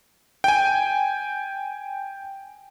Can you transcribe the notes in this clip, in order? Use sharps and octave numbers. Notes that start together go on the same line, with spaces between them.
G5 G#5